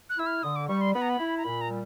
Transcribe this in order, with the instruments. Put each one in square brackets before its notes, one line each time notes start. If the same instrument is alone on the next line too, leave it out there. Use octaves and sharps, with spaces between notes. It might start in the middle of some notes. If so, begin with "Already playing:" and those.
[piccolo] F#6
[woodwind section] E4 [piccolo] E6
[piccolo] F6
[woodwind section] D3 [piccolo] D#6
[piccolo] D6
[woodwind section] G3 [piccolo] C#6
[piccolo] C6
[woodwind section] B3 [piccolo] B5
[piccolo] A#5
B5
[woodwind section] E4
[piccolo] A#5
[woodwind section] A#2 [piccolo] B5
[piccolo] A#5
[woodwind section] G3